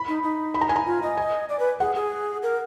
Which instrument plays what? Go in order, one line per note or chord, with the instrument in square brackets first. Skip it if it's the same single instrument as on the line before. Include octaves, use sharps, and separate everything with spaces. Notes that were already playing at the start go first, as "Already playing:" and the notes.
Already playing: [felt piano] B5
[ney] D#4
D#4
[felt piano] B5
A#5
G#5
A#5
[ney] F4
D#5
[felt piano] G#5
[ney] D5
B4
[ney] G#4 [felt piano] F#5
[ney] G#4
A#4